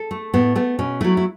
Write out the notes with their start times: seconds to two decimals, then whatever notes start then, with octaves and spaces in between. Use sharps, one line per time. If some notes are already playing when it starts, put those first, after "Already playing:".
Already playing: A4
0.11 A3
0.34 A2 B3
0.55 A3 B3
0.79 B2 C#4
1.01 F#3 A3 E4
1.17 E4